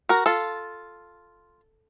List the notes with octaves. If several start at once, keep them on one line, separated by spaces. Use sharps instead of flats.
F#4 A#4
F4 A4